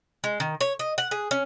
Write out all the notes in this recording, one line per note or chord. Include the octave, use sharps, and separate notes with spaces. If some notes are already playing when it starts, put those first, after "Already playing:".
G#3
D#3
C#5
D#5
F#5
G#4
C#4